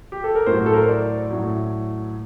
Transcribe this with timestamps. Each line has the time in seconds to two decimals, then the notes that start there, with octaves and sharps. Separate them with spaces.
0.12 G4
0.24 A4
0.35 A#4
0.46 A2 F#3 C5
0.66 A4
0.73 A#4
0.81 C5
0.89 D5
1.30 A2 F#3